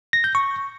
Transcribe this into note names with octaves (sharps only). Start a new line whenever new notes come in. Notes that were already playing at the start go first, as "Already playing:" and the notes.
A#6
G6
C#6